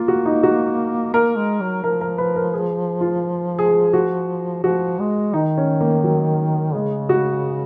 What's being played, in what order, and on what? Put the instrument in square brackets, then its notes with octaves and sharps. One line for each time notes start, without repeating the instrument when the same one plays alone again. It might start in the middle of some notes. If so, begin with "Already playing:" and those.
Already playing: [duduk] A#3 [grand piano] F4
[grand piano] F#4
D#4
F#4
[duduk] A#3 [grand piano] A#4
[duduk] G#3
F#3
[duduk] F3 [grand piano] A#4
[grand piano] A#4
B4
A#4
G#4
F4
G#4
F#4
[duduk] F3 [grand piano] F#4
[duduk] G#3
[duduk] D#3 [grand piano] D#4
[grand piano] C#4
A#3
F#3
[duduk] C#3 [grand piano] G#3
[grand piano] F#4